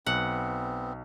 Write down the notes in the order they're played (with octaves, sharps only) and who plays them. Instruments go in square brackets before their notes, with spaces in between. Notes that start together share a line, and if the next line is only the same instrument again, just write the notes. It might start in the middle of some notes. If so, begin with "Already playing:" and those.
[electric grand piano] B1 [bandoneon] B3 C4 [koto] F#5